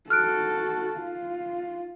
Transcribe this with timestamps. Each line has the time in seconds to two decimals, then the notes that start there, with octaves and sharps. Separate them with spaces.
0.10 F#4 A4 F6 F#6 D7
0.96 F4